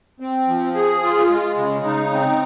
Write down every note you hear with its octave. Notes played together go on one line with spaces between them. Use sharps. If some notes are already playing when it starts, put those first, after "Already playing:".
C4
F3
G#4
F4
G#3
C#3
D#4
C4